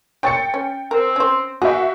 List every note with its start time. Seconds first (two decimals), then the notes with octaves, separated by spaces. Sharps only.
0.23 G#3 C#5 G5 A6 C#7
0.54 C#4
0.91 C4 A#4
1.16 C#4 C5
1.62 A#3 F#4 G#4 E5 F5 G5